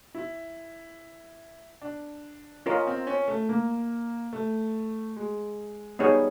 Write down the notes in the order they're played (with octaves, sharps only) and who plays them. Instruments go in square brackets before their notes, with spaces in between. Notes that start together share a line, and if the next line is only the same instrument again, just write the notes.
[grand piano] E4
D4
[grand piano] C#4 [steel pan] F4 A#4 D#5
[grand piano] C4
C#4
A3
A#3
A3
G#3
[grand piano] G3 [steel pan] B3 D#4 G#4 C#5